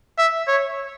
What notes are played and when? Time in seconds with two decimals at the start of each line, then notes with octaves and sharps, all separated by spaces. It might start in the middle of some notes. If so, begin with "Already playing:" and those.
0.18 E5
0.48 C#5